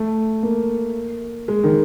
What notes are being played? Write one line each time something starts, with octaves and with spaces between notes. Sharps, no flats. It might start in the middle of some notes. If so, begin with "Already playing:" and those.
Already playing: A3
A#3
G#3
D#3